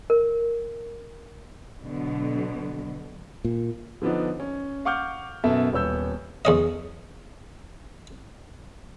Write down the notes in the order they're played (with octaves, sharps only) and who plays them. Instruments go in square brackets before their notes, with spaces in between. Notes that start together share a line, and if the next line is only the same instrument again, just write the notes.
[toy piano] A#4
[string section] B2 D3 F#3
[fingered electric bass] A#2
[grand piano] D3 F3 B3 D4 D#4
C#4
F5 F#5 C#6 D6 F6 G6
F#2 B2 A4 E5
D#1 B3 C#5 E6 G6
[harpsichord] E2 C#4 D#5